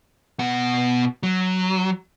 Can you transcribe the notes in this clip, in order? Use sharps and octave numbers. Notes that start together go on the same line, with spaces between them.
B2 F#5
F#3